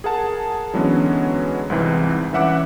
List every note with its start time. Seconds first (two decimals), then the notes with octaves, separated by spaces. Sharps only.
0.04 G#4 A#4 F#5 A5
0.74 D3 E3 F#3 G#3 B3 C#4
1.70 C2 G#2 E3 C4
2.33 E3 C#4 E5 F#5 D6 F#6